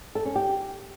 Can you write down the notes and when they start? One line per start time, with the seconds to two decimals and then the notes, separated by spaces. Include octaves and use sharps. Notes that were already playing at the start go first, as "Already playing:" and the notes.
0.15 A4
0.25 C#4
0.36 G4